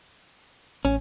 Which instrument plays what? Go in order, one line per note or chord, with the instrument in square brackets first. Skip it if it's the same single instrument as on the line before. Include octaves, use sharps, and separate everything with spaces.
[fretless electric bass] A1 [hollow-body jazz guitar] C#4